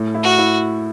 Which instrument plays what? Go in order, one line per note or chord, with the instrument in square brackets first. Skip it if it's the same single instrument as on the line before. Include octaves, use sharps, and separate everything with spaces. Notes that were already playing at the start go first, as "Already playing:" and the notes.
Already playing: [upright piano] A2
E4
[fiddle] F#4
[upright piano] E4